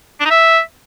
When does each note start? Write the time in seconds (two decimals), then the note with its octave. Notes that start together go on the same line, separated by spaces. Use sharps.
0.20 D4
0.25 D#4
0.30 E5